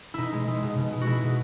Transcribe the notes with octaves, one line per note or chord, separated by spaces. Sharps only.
B2 D#4 E4
G#3
G#3
B2
B2
G#3
F#4
G#3 E4
B2